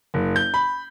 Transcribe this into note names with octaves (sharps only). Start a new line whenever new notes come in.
F#1
G6
B5